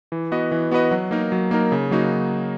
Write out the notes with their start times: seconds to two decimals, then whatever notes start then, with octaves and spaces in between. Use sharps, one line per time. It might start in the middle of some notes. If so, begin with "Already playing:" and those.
0.12 E3
0.32 B3 F#4 B4 D#5
0.52 E3
0.71 B3 F#4 B4 D#5
0.91 F#3
1.11 A#3 D#4 A#4
1.32 F#3
1.51 A#3 D#4 A#4
1.72 C#3
1.91 F#3 A#3 D#4 F#4